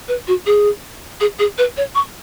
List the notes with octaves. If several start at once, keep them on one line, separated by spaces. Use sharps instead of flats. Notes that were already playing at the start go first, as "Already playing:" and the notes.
B4
F#4
G#4
G#4
G#4
B4
C#5
C#6